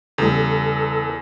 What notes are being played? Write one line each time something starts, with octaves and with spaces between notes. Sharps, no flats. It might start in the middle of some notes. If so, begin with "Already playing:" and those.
E2 C#3 G3 A4